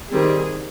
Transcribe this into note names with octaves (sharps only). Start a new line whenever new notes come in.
D#3 G3 C4 G#4